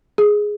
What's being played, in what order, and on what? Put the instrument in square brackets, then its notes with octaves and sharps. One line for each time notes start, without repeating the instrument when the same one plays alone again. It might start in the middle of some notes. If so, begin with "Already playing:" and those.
[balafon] G#4